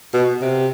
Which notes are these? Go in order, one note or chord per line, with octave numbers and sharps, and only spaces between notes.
B2
C3